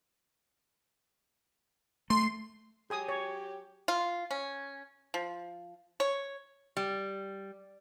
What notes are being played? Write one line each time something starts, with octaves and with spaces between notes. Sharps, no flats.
A3 C6
F#3 G4 G#4 G#5 D#6
C#5
F4
C#4
F3
C#5
G3